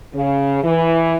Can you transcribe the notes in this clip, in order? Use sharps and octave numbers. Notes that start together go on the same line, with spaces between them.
C#3
E3